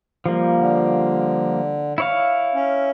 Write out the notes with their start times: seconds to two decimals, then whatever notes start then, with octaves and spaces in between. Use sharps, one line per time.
0.26 F3 G3 A#3
0.57 D3
1.98 E4 C#5 F5
2.54 C#4